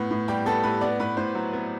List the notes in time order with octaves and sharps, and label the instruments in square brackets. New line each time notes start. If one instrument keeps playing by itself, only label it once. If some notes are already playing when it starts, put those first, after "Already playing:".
Already playing: [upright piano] A2 B3
A2
G3 G4
B3 A4
A2 B4
B3 D5
A2 B4
A2 C5
F#3
B3